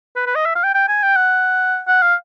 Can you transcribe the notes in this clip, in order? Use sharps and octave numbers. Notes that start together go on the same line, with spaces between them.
B4
B4
D#5
E5
F5
G5
G5
G#5
G5
F#5
F#5
F5